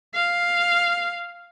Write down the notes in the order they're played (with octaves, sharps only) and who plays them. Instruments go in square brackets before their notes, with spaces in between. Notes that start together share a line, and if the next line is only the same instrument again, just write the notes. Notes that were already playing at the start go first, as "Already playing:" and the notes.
[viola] F5